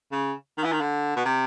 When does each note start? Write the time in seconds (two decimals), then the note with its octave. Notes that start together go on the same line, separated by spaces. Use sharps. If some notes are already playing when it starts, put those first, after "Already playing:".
0.12 C#3
0.58 D#3
0.64 E3
0.72 D#3
0.81 D3
1.16 B2
1.25 C3